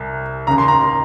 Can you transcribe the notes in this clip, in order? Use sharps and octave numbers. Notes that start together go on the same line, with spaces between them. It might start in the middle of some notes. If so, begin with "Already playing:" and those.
Already playing: C2 C3
D#2 C#3 A#5
C6
A#5